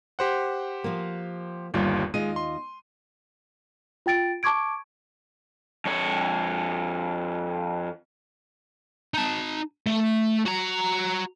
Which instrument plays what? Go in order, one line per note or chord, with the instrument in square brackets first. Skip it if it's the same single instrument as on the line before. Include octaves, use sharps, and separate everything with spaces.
[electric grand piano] G4 C5 F#5
[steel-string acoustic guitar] F3 A#3
[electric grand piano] G1 D#2 F4 [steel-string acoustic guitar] G3
[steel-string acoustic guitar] D#2 F4 D#5 [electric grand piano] G#3 D#7
[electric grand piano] C6
[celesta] F4 G5 A6 D7
A5 C#6 D6 G#6 D7
[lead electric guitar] F2 C#5
[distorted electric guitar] D#4 A5
A3
F#4 A#5